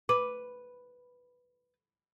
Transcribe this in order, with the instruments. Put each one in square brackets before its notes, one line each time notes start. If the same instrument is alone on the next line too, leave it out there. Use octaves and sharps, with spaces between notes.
[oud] B4 [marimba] D6